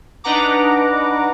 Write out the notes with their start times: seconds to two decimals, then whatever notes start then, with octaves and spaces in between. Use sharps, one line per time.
0.24 D4 D#4 B4 F#5 A#5 D6